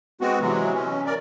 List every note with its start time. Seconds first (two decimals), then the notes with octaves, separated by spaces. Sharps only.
0.21 G#3 B3 C4 F#4
0.41 C3 E3 F#3 G#3
0.74 C#4
1.06 A#4 D5